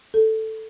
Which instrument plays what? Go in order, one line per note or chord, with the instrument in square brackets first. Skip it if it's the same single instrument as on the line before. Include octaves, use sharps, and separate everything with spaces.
[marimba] A4